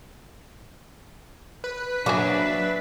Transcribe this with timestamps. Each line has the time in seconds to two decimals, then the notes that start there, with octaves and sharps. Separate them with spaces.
1.64 B4
2.06 F#3 A#3 D4 F#4 G#4 E5